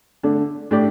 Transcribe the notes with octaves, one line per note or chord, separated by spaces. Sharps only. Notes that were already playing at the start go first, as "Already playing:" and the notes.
D3 A3 D4
A2 A3 D4 G4 D5